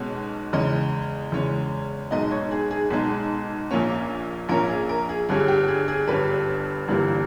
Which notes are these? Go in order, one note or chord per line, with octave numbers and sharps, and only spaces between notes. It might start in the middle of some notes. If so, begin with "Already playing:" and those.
Already playing: B1 B2 G#3 C#4
E2 C#3 G#3 C#4 D#5
E2 C#3 G#3 C#4
B1 B2 G#3 D#4 D#5
C#5
G#4
G#4
B1 B2 G#3 D#4 G#4
A#1 A#2 A#3 C#4
A#1 A#2 A#3 C#4 A#4
G#4
A#4
G#4
G1 G2 G3 C#4 G#4
G4
G#4
G#4
G1 G2 G3 C#4 B4
G1 G2 E3 G3 A#3